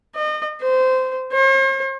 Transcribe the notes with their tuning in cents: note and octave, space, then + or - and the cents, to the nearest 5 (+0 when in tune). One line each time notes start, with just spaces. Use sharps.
D#5 -35
C5 -20
C5 +45